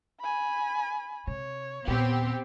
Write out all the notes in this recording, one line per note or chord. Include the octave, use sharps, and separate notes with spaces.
G#5 B5
C3 C#5
D#2 A#2 B3 C4 G4